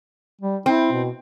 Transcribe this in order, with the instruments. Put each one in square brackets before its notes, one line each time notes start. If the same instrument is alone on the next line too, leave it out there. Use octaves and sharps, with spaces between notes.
[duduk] G3
[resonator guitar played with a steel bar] C4 [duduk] E4
[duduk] B2